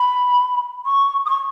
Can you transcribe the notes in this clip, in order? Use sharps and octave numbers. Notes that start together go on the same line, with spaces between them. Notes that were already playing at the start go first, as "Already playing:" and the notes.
Already playing: B5
C#6
D#6
C#6